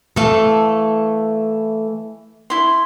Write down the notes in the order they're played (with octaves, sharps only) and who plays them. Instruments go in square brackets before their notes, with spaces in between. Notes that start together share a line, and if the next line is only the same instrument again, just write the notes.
[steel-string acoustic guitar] E3 A3 [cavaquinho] A4 E5 F5
[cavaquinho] E4 C6